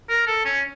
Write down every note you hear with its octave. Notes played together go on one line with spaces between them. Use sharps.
A#4
A4
C#4